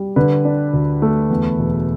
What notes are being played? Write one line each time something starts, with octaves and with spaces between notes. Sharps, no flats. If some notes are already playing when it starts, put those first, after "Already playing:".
Already playing: G3
D3 B4
D4
D2
A3
E2
E1